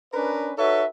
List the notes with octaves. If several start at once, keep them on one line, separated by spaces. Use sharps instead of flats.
C#4 D4 A#4 B4
D#4 F#4 A4 B4 C#5 E5